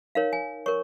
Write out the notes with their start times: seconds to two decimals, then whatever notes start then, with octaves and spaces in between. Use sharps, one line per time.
0.15 D#4 A#4 C#5 F5
0.33 G#5
0.66 A#4 C#5 C#6